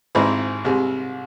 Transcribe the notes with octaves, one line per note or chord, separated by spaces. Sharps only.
G#1 G#2 G#3 C4 E4
C2 C3 G#3